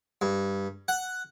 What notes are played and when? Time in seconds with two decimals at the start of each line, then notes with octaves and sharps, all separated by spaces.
0.21 G2
0.88 F#5